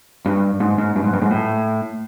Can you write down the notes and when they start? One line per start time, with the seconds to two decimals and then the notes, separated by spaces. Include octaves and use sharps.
0.26 G2
0.60 G#2
0.78 G#2
0.96 G2
1.04 G#2
1.13 G2
1.22 G#2
1.31 A2